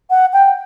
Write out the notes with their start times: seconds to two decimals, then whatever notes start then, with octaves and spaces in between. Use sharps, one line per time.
0.10 F#5
0.33 G5